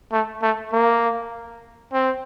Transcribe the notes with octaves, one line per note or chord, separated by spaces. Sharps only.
A3
A3
A#3
C4